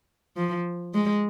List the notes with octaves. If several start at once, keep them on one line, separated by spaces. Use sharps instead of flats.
F3
G#3